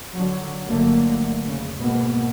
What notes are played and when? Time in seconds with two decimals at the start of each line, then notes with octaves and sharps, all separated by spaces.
0.14 D3 F#3
0.67 G1 D3 F#3 A3 A#3
1.46 F2 C#3
1.79 G#2 B2 A#3 B3